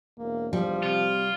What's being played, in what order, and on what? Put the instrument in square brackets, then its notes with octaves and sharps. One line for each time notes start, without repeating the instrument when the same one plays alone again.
[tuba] E1 [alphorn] A#3
[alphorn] F3 [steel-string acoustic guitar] G3
[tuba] C3 [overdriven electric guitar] F4